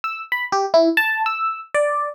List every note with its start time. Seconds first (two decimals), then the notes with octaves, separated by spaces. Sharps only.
0.04 E6
0.32 B5
0.52 G4
0.74 E4
0.97 A5
1.26 E6
1.74 D5